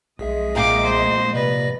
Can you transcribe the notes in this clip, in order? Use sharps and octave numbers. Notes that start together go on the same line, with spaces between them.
B1 F2 G#3 G#4 D#5 E5
A#2 A#4 F5 G5 D6
C5
C3 B4 D5 A#6